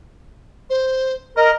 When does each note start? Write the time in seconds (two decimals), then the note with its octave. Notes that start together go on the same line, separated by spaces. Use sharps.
0.70 C5
1.37 A#4 D#5